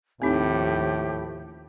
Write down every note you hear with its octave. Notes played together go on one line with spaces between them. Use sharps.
D#2 A2 F3 C4 D#4 G4